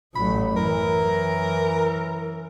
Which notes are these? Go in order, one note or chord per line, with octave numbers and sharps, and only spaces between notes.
A1 F#3 B5
F#2 E3 A#4